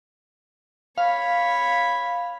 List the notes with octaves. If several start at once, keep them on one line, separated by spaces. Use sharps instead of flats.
C#5 F5 B5